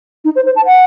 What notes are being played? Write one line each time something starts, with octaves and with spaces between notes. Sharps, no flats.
D#4
C5
C5
A5
F#5